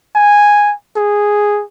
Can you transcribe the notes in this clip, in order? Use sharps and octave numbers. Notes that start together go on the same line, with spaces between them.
G#5
G#4